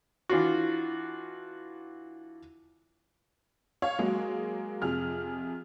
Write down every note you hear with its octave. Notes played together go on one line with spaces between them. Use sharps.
E3 D4 F4 F#4
C#5 F5
F#3 G#3 A#3 G#4
F2 C3 G#4 F6